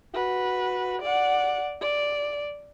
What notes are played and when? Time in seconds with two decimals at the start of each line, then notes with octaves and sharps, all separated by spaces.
0.15 F#4 B4
1.02 D5 F#5
1.81 D5